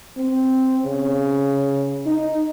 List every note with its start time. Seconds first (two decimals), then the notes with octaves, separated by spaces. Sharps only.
0.17 C4
0.85 C#3
2.06 D#4